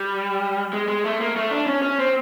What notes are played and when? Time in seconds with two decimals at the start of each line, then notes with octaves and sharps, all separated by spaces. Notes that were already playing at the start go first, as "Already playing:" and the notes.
Already playing: G3
0.73 G#3
0.88 G#3
1.04 A3
1.20 A#3
1.36 A3
1.51 D4
1.66 C#4
1.82 C#4
1.99 C4